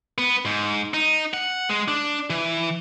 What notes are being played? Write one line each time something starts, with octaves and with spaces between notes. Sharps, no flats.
B3
G#2
D#4
F#5
G#3
D4
E3